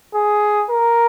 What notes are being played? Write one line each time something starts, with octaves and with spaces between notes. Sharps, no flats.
G#4
A#4